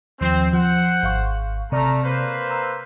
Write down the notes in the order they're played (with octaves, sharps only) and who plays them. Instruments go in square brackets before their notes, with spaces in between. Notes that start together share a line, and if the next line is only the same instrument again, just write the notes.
[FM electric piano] D#2 F3 [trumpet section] C4
[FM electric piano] F3 [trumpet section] C5 F#5
[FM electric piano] G#1 F5 C#6
[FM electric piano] C3 D5 F6 [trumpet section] A3 A#5
[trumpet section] A#3 B4 C5
[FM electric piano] A#5 E6